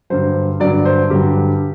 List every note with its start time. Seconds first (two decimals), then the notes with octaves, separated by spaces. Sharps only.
0.10 G2 D3 F#3 C5
0.60 G2 D3 F#3 D5
0.85 C5
1.10 G2 D3 F#3 G4